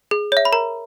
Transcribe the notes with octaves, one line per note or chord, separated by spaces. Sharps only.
G#4
C#5 E5
B5
A#4 A#5